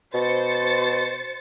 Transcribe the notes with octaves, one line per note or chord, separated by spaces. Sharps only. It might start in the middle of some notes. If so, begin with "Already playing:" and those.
B2 C5 A6 C#7